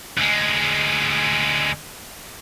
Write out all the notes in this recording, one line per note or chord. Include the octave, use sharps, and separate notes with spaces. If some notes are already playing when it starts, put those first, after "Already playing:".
D2 G#3